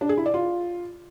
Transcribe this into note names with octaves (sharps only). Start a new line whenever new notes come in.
D4
G#4
E4
D5
F4